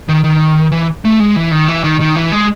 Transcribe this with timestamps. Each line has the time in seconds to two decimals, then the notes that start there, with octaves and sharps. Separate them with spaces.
0.09 D#3
0.24 D#3
0.72 E3
1.05 A3
1.20 G#3
1.36 E3
1.51 D#3
1.68 E3
1.84 D#3
2.00 D#3
2.16 E3
2.32 G#3